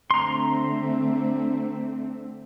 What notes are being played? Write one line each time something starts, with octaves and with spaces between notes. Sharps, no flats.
D3 A3 C4 A#5 C6